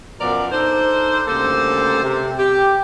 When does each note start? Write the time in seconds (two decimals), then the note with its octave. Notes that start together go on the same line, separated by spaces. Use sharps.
0.21 F#2 B2 F3 A#4 D5
0.52 D4 D#4 A4 C5
1.27 D2 C#3 G3 A#3 A4 C5
2.03 C3
2.39 G4